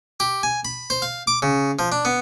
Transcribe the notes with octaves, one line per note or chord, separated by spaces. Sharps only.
G4
G#5
B5
C5
F5
D6
C#3
F3
D4
B3